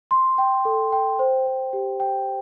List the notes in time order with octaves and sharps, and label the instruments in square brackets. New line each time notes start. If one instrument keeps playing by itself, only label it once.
[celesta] C6
G5
A4
G5
C5
C5
G4
G5